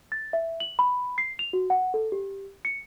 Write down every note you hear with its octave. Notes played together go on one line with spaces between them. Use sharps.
A6
E5
F#7
B5
C7
F7
F#4
F#5
A4
G4
C#7